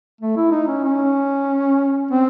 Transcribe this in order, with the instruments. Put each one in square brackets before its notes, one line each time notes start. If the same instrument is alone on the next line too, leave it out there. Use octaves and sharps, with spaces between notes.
[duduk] A3
E4
D#4
C#4
C#4
C4